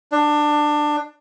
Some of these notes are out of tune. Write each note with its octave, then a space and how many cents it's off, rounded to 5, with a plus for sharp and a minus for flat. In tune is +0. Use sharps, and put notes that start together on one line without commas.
D4 +20